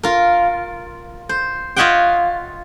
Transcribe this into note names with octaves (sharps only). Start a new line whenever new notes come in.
F4 A#4
C5
F4 C#5 D#5 E5 F#5 G5